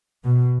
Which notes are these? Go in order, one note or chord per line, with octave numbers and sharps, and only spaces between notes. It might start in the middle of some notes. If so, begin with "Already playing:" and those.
B2